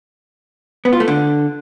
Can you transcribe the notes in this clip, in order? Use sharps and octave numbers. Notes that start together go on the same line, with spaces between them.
B3
F4
A3
D3